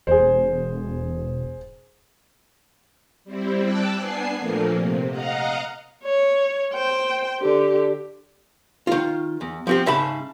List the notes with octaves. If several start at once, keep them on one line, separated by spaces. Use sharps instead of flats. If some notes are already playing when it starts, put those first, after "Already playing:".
E1 G#4 C5
G3 C4 E4
G5 A5 D6 E6 F#6
B3 D4 G#5 C7
A#2 F3 A3 A#3
C3
D#5 F5 F#5 A#5
C#5
C5 G5
D3 G4
D#3 F4
E2
F3 C4 G4
G#2 C#3 E5 A5 B5